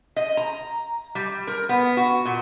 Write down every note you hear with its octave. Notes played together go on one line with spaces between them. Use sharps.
D#5
A#5
G3
A#4
B3
F#4
A#2